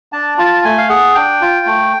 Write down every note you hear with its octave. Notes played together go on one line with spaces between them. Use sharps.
D4 A5
F4 A5
A3 G#5
F5
G#4 F#5
D4 G5
F4
A3